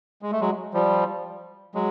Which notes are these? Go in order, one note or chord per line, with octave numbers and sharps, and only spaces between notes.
G#3
A3
F#3 G#3
F3 G3
F#3 G#3